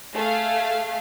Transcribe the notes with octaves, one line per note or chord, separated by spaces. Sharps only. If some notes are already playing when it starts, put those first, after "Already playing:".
A3 G#4 F5